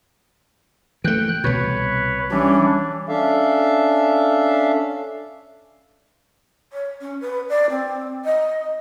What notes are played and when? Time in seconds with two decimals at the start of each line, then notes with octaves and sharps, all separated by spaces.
1.04 E3 A3 G5 F#6
1.44 C2 B2 B4 C#5
2.31 E3 G3 C#4 D4
3.09 C#4 D4 A4 E5 F5
6.73 C#5
7.01 C#4
7.21 B4
7.49 D5
7.70 C4
8.25 D#5